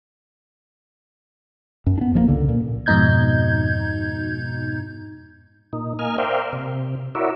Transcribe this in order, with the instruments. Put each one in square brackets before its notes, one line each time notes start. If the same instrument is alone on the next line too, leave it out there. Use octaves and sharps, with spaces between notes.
[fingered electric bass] F#2
B3 D4
A1 F3 A3 A#3
C#2 D3
A#2
[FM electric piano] F2 G#2 B2 D#4 G6 G#6
[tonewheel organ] A#2 D#4
A#3 D#5 G#5 F6
A#4 C5 D5 E5 F5 G5
C3
E4 F#4 A#4 C#5 D5 E5